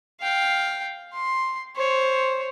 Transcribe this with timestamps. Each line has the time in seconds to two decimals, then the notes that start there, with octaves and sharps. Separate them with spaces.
0.21 F5 G5
1.14 C6
1.76 C5 C#5